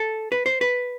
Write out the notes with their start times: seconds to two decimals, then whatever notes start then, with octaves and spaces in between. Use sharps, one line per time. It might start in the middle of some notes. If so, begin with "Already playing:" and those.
Already playing: A4
0.32 B4
0.46 C5
0.61 B4